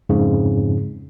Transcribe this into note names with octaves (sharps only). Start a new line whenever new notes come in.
F2 G#2 C#3